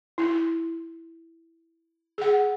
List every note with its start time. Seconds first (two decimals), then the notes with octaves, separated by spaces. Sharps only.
0.18 E4
2.18 G#4 F#5